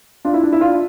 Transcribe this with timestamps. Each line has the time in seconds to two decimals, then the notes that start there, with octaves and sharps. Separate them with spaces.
0.25 D4 F4
0.34 E4
0.43 D4
0.53 E4
0.61 D4 F4